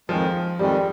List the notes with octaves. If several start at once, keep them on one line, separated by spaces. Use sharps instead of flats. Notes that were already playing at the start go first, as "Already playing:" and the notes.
F2 D#3 F3 G#3
F2 D#3 G3 G#3